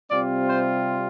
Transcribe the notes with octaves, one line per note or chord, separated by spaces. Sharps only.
C3 G3 C4 F4 D5
C5